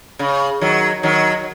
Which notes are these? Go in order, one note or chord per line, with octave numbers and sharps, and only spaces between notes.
C#3
D#3 F#3
D#3 F#3